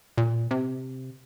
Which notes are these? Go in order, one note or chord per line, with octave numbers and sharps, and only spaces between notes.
A#2
C3